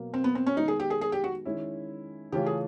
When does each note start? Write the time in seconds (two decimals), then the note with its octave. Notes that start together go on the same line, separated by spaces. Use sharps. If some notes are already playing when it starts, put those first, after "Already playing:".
Already playing: B2 F#3 A#3
0.14 C4
0.24 B3
0.35 C4
0.46 C#4
0.57 D#3 G#3 B3 D#4
0.68 G#4
0.80 G4
0.90 G#4
1.01 G#4
1.12 G4
1.24 F#4
1.45 D#3 G#3 C#4 E4
2.32 C#3 E3 A3 C#4 F4 G4
2.46 G#4